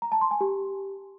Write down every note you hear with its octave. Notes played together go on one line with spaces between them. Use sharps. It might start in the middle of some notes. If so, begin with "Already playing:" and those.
A#5
A5
C6
G#5
G4